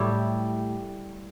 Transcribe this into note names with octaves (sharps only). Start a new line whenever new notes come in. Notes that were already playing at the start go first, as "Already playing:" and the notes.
Already playing: A2 G3 E4 G4